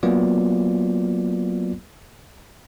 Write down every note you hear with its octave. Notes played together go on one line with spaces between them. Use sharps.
F#3 A#3 B3 F4 D5